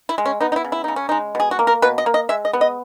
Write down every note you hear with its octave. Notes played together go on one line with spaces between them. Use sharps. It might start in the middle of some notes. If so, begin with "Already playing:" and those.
E4
G#3
C#4
B3 D#4
D#4
E4
C#3
E4
C#3 D#4
C#4
G#3 D#4
B2 G#4
F#4
A#3
A#4
B2 B4
D#5
A#3
D#5
G#3 E5
D#5
B3
D#5